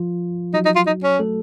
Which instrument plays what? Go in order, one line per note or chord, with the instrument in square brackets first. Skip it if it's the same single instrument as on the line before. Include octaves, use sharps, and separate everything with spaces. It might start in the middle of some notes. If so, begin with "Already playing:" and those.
Already playing: [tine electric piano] F3 F4
[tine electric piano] F#3 F#4 [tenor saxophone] D#4
[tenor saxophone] D#4
F4
D#4
C#4
[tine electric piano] A3 A4